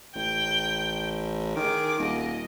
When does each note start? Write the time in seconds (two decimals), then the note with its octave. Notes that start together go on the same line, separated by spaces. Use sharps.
0.15 A1 G5 G6
1.57 D#3 G#4 D6
2.00 D#1 D#5